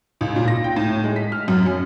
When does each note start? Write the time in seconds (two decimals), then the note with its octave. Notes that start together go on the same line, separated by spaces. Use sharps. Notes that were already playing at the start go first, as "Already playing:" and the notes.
0.21 C#2
0.36 A#2
0.48 A#6
0.64 G5
0.76 A2
1.04 G#3
1.16 B6
1.32 F6
1.48 F#2
1.66 C#4